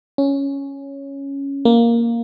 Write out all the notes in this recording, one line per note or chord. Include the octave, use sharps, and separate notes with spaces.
C#4
A#3